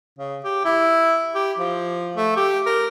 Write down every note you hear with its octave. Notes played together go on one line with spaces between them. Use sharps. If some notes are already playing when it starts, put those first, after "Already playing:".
C#3
G4
E4
G4
F3
A3
G4
A#4